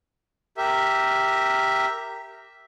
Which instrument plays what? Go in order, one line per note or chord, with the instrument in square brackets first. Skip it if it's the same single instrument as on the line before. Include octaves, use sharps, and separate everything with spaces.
[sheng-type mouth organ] G4 A#4 E5